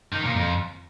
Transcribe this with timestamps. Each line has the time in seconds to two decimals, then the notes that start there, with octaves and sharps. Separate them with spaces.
0.13 D#3
0.24 A#2
0.35 F2